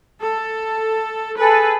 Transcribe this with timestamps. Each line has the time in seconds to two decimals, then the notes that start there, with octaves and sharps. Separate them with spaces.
0.19 A4
1.38 G#4 A4 B4